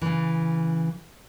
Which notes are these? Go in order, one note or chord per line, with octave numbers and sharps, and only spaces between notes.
C#3 E3